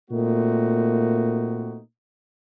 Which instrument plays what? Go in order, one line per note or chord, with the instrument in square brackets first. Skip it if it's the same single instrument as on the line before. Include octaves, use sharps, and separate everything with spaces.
[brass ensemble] A#2 A3 A#3 C4 D#4 F#4